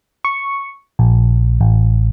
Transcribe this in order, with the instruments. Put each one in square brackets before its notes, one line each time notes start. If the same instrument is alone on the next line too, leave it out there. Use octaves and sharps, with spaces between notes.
[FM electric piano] C#6
A#1
A1